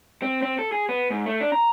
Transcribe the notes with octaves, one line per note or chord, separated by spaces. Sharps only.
C4
C4
A4
G#4
B3
G#2
A3
D4
A#5